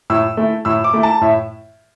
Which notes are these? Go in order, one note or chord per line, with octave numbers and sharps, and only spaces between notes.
A2 E6
A3 E4
A2 E6
D6
A3 E4
A5
A2 E5